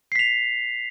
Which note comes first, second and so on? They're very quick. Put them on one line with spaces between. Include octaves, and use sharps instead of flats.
C7 B6 F7